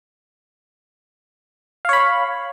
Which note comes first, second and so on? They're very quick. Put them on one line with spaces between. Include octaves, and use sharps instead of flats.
F5 C#5 B5